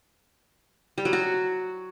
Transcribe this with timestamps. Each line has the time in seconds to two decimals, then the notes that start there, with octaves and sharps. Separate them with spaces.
0.98 G3
1.05 F#3
1.13 F#4